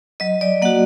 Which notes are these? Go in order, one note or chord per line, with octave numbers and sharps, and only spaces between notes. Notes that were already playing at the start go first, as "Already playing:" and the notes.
F#3 D#5
D5
A#3 F#4 F#5